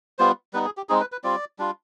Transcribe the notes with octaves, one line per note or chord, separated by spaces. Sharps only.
G3 B3 F4 C5
G3 B3 D#4 B4
G#4
G4
G#3 C4 D#4 G#4
B4
B4
G3 C4 F4 D5
G3 D4 F4